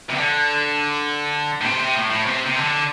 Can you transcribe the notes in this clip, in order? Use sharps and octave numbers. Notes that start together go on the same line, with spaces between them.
C3
D3
A2
C3
C3
A2
A2
C3
C3
D3